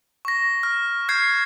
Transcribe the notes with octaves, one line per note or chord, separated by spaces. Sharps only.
C#6 A#6
F6
F6 G6 G#6 C7